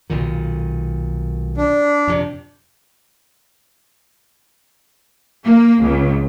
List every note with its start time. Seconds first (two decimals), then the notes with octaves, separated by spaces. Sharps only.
0.10 B1 A#2 D#3
1.57 D4
2.07 F2 C3
5.44 A#3
5.81 C#2